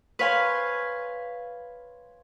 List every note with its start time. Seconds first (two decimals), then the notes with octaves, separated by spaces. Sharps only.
0.19 B4 C#5 F5 G#5 C6